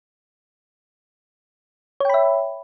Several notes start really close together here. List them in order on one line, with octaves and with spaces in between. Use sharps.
C#5 G5 B5 E5